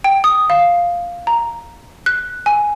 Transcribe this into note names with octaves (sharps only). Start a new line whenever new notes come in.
G5
D#6
F5
A#5
F#6
G#5